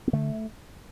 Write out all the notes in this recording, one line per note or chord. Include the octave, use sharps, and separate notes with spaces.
B3
D3 A3